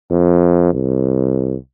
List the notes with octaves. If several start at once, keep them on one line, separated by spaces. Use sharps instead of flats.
F2
C2